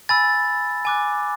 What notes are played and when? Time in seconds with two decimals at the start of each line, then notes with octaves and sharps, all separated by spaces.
0.09 G#5 B5 E6 A6
0.85 G#5 D6 F#6